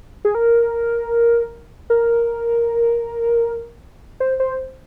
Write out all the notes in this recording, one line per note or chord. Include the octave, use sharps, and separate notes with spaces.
G#4
A#4
A#4
C5
C5